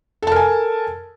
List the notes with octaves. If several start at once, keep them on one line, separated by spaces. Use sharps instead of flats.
A4 A#4 G#5 A5